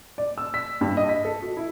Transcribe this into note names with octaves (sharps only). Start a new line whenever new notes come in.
D5
E6
B6
G2
D#5
B6
A4
F#4
E4